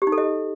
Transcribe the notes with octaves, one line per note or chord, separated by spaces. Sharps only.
G4
D#4
A4
D#5